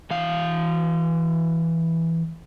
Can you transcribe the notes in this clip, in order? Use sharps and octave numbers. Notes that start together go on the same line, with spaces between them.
E3 F5